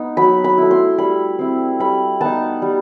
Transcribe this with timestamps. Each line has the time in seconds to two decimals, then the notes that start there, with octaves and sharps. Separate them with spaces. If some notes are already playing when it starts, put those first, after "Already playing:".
Already playing: B3 D#4
0.17 F#3 B5
0.44 B5
0.58 A3 E4
0.71 C6
0.98 G3 B5
1.39 C4 E4
1.79 G3 B5
2.21 B3 D#4 A5
2.62 G3